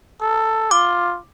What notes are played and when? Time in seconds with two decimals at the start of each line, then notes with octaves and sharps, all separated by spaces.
0.21 A4
0.71 F4 D6